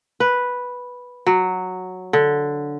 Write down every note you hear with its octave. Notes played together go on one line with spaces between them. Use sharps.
B4
F#3
D3